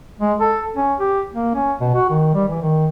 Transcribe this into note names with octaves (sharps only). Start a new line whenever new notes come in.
G#3
A4
C#4
G4
A#3
C#4
B2
F#4
D#3
G3
E3
D#3